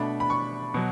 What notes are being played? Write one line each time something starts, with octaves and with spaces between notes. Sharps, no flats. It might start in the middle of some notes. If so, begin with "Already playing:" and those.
Already playing: B2 A3 D4 B5
B5
C#6
B2 F#3